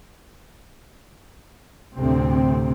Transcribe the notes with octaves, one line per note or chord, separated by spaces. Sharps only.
D2 A2 C3 C4